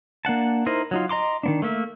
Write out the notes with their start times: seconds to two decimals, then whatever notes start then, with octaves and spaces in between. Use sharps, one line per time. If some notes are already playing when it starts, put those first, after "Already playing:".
0.25 A#3 D4 F#5 A5
0.66 D#4 E4 A#4 C5 D#5
0.91 F#3 D#4 F4
1.09 D#5 A#5 C6 D6
1.43 D#3 B3 D4
1.62 A3 A#3 E5